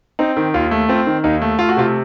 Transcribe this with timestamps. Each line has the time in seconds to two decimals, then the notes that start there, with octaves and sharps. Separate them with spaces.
0.19 C4 D#4
0.37 D#3
0.54 D#2 F4
0.71 A3
0.89 C4 F4
1.07 D#3
1.24 D#2 D#4
1.42 A3
1.59 A3 F4
1.69 F#4
1.77 C3 F4